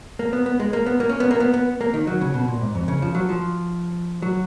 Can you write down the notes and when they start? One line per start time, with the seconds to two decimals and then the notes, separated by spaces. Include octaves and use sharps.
0.19 A#3
0.33 B3
0.46 B3
0.60 G#3
0.73 A#3
0.86 B3
1.00 A#3
1.09 C#4
1.20 B3
1.31 A#3
1.40 B3
1.54 B3
1.81 A#3
1.94 D#3
2.07 F#3
2.21 C#3
2.34 B2
2.48 A#2
2.61 G#2
2.75 F2
2.88 C#3
3.02 F3
3.15 F#3
3.29 F3
4.22 F#3